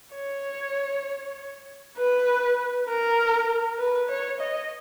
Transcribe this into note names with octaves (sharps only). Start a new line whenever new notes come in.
C#5
B4
A#4
B4
C#5
D#5